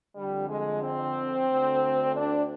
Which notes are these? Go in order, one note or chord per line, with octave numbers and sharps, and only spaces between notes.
F2 D3 G3
G#3
C4
D2 D3
D4